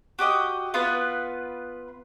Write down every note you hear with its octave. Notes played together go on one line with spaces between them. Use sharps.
F#4 G4 D#5
B3 F4 B4